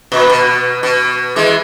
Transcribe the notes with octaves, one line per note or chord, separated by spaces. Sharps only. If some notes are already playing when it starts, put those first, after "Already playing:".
A#2
B2
B2
E3 G#3